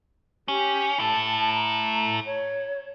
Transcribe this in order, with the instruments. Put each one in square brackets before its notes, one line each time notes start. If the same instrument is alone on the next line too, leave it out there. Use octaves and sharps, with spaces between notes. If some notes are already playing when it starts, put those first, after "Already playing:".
[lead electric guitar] C#4 [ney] G4
[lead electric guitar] E4 A4 [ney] A5
[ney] A#5
C#5